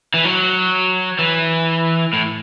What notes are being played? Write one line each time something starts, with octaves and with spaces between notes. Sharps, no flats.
E3
F#3
E3
A2